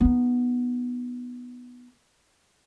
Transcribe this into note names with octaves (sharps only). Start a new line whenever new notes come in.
B3 D#4